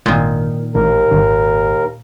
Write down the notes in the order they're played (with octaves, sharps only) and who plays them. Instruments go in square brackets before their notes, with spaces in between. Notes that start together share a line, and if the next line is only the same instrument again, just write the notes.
[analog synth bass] G#1 [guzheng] A#2 D#3
[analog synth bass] A1 [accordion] D#2 A#4
[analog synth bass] G#1